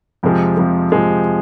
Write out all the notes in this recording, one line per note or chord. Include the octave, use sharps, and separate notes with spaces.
F2 C3 F3 G#3
F2 C3 F3 G#3
F2 C3 F3 G#3